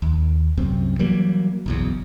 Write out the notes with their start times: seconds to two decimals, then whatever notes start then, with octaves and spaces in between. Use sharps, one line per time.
0.02 D#2
0.57 C2 F#2 C3 C4
0.99 E3 F#3 G3 A#3
1.66 F#1 B1 E2